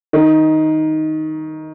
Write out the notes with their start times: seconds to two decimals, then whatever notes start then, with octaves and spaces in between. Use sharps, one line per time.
0.13 D#3